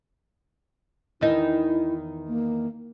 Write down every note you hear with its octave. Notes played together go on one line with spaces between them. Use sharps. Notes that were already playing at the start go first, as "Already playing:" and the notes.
E2 D#3 D#4 E4
A#3